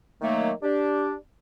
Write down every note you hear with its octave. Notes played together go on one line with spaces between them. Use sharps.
D#3 F#3 A3 A#3
D4 G4